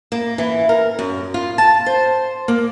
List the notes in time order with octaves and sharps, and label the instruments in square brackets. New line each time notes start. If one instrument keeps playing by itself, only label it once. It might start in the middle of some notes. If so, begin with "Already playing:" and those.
[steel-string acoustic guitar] A#3
E3
A#4
F#2
F4
A5
C5
A#3